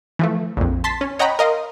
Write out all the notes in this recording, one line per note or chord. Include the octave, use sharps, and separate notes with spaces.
E3 F3 A3
A#1 F2
A5 C6 A6 B6
C#4
C#5 D#5 F#5 G5 A#5 B5
A#4 D#5 F5 C6